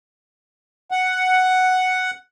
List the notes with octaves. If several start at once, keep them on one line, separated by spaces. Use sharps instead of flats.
F#5